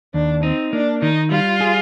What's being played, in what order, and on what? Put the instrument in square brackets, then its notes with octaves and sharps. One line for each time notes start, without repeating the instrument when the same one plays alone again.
[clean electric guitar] D#2 [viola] D4
[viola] C4 [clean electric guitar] D#4
[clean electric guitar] A#3 [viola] D4
[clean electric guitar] D#3 [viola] D#4
[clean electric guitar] G3 [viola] F4
[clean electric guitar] G#4